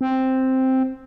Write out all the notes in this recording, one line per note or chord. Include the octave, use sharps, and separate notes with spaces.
C4